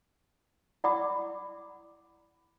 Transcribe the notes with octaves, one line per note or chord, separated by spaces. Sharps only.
E4 D5 F#5 B5 D6 D#6